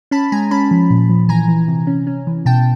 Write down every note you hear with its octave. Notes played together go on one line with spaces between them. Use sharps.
C#4 A5 B5
G#3 G#5 A#5
C#4 A5 B5
F3
A#2
F3
E3 G#5 A#5
E3
C3
C#4
C#4
E3
B2 G5 A5